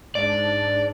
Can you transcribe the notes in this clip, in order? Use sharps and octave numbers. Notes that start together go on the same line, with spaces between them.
G#2 D4 D5